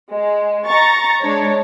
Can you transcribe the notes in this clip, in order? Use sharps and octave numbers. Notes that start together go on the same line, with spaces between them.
G#3
A#5 C#6 A6
G#3 D4 C#5